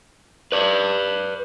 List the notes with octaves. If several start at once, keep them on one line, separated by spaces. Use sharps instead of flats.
B4 D5